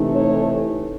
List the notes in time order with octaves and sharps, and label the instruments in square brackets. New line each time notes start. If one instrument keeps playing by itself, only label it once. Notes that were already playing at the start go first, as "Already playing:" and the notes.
Already playing: [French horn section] C3 E3 A3 D#4
A4 C#5